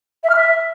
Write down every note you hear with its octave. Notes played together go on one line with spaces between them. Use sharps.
E5
F6
E5